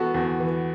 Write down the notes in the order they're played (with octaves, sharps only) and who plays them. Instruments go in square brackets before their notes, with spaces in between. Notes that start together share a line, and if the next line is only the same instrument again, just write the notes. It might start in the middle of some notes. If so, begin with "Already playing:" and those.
Already playing: [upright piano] E3 B3 [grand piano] F#4 A4
[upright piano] E2
E3